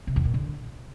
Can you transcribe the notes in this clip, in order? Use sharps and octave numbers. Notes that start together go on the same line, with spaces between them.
C3
E2
A#2
D3